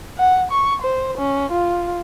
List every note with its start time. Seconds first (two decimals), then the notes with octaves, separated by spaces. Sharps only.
0.18 F#5
0.52 C#6
0.82 C5
1.18 C#4
1.52 F4